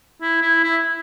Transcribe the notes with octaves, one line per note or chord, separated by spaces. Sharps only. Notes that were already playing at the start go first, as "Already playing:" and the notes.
E4
E4
E4